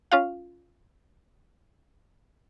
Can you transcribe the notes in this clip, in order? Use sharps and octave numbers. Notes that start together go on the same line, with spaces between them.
C#4 F4 F5